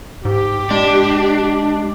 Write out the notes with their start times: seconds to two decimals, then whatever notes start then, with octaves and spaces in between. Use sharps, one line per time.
0.25 G#2 G4
0.71 G#3 D4